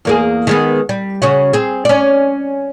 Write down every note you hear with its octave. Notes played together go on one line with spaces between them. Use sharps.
E2 A#3 G#4
D#3 G#3 B3
G3
C#3 C#4 F#4
C4 G#4
C#4 D5